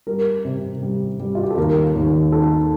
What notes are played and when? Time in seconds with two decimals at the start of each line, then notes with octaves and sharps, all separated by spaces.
0.07 G3 A#4
0.45 C3
0.83 G3
1.20 G3
1.35 F4
1.43 G4
1.50 A4
1.57 D#2 A#4
1.95 D#2
2.32 D#3 A4